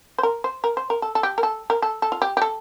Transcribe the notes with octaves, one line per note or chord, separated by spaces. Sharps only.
C5
A#4
C5
A#4
C5
A#4
A4
A4
G4
A#4
A4
A#4
A4
A4
F4
G4
G4
A4